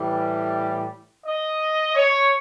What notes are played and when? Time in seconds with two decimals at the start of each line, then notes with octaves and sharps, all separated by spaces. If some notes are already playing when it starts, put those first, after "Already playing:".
Already playing: A2 E3 G3
1.26 D#5
1.95 C#5